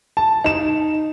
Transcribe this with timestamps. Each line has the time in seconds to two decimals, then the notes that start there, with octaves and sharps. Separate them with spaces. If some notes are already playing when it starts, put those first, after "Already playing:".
0.17 A5
0.44 D#4 E7